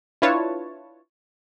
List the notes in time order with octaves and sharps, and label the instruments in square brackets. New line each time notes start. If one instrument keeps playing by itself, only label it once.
[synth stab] D4 E4 F4 B4 C#5 A5